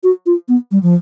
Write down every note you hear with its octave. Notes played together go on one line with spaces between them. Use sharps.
F#4
F4
B3
G3
F3